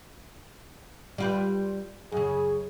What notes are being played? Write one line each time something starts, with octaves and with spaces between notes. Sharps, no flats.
G3 F4 B4
F#2 C#3 G#4